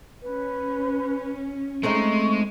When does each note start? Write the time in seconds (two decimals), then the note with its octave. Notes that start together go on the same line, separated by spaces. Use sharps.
0.22 C#4 B4
1.83 G#3 A3 C4 D#4 C#6